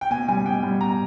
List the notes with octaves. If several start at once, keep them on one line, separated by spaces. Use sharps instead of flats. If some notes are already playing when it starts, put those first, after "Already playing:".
G5
B2 G#5
G3 G#5
B2 G5
G3
B2 A#5